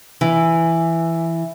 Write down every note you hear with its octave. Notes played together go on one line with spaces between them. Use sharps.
E3